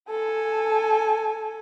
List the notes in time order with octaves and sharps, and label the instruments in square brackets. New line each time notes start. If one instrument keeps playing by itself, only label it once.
[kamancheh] A4 G#5